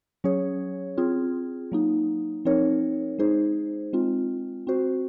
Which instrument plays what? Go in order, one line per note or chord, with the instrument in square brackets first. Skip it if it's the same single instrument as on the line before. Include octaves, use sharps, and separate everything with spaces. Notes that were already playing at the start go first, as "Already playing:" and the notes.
[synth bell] F#3 C#4 G#4 C#5
C4 F4 G#4
F#3 A#3 D#4
F3 C4 D#4 A#4 C#5
G#3 D#4 G#4 C5
G#3 C4 F4
C4 F#4 C5